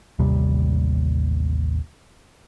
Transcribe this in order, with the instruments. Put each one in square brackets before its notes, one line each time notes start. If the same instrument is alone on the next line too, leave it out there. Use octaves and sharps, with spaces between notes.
[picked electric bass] A1 D#2 C3 G3